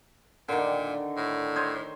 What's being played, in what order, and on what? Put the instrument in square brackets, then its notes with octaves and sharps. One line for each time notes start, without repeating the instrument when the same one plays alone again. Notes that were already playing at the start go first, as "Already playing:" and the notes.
[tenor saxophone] A#2 [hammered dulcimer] D3 D#3
[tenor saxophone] A2
[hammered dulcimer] C5 C#5 D#5